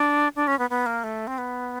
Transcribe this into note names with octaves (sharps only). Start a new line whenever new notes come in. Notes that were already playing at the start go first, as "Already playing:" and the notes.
Already playing: D4
D4
C#4
B3
B3
A#3
A3
C4
B3